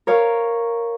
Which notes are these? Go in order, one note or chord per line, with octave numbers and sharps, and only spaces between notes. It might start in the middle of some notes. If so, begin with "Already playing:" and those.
A#4 C#5 F5